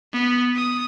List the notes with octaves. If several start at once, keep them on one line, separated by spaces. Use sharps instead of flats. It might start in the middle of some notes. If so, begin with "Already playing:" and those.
B3
D#6